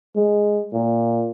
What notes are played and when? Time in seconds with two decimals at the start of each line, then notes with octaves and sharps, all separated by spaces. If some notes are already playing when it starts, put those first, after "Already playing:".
0.16 G#3
0.73 A#2